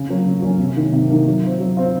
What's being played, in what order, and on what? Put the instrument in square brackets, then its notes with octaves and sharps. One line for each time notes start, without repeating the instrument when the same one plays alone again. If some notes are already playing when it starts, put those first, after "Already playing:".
Already playing: [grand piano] C#3
F#3 A#3 C#4 F4
C#3
F#3 A#3 C#4 F4
C3
D#3 A#3
C3
D#3 A#3
F#3
C4 F4
F#3
C4 F4